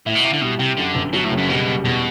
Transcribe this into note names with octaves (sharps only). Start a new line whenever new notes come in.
A2 E4
B2
C3 E4
D3
B2 G3
C3 G4
F#2 D3
G1
B2 F#3
A2
F#1
F#2
B2 G3
G3
E2 B2